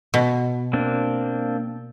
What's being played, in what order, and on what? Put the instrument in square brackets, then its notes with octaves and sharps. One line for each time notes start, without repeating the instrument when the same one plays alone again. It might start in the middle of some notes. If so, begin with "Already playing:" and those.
[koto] B2
[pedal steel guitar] A#3 C4 D4